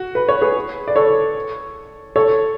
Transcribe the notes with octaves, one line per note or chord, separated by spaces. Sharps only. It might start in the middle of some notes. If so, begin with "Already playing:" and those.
Already playing: F#4
B4
C#5
G#4 B4
D5
A4 C#5
A4 C#5